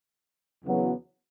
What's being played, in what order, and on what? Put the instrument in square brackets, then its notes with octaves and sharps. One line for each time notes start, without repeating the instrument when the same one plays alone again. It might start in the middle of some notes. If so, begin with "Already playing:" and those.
[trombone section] E2 C#3 F#3 B3